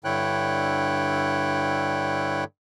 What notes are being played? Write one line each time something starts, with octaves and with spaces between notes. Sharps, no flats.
G2 D3 E4 C#5 G5 F#6